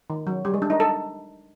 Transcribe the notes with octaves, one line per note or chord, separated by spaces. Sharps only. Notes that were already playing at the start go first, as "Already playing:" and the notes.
D#3
F#3
G3
G#3
D4
D#4
A4